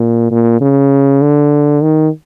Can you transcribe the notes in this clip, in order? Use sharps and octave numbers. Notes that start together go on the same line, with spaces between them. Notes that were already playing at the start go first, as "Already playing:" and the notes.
Already playing: A#2
A#2
C#3
D3
D#3